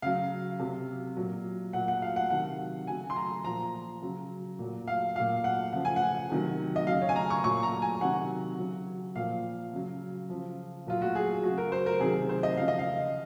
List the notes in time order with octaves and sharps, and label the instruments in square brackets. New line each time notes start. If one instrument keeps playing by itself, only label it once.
[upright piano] C#3 F#3 F5
C3 F#3
A#2 F#3
A#2 F#3 F#5
F#5
F5
F#5
C3 D#3 F#3 F#5
C#3 F#3 G#5
C6
A#5
A#2 F3 A#5
C#3 F#3
A#2 F#3
F5
A#2 F#3 F5
F#5
C#3 F3 F#5
G#5
F#5
C3 D#3 F#3
D#5
C#3 F#3 F5
C#5
G#5
A#5
C#6
A#2 F#3 C#6
A#5
G#5
C3 D#3 F#3 F#5
C#3 F#3
A#2 F3 F5
C#3 F#3
C#3 F3
A#2 F#3 F4
F#4
G#4
C#3 F#3 F#4
A#4
C5
A#4
C3 D#3 F#3 G#4
C5
D#5
C#3 F3 F5
D#5
F5